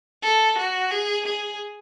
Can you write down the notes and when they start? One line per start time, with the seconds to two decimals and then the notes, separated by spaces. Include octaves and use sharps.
0.23 A4
0.58 F#4
0.91 G#4
1.25 G#4